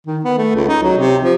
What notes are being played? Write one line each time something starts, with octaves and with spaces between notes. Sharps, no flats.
D#3
B3
A3
C#2
D#4
F#3
C3
F3